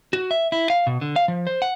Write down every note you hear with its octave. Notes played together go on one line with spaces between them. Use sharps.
F#4
E5
E4
F5
B2
D3
F5
F3
C5
F#5